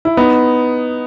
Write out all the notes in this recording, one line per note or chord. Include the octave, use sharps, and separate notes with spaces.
E4
B3 D#4